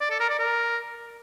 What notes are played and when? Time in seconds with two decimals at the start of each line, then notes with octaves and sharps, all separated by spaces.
0.01 D5
0.10 A4
0.20 A#4
0.30 D5
0.39 A#4